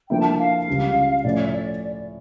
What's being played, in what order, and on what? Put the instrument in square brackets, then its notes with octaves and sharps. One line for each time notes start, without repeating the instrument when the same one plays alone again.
[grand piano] D3 F3 A#3 E4 [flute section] G5
[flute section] A5
A5
F5
[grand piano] C#2 C#3 G3
[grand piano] A2 F3 C#4 [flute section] D5
[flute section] C#5
E5
D5